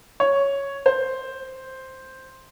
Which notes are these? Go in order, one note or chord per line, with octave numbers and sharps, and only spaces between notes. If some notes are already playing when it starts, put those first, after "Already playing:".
C#5
C5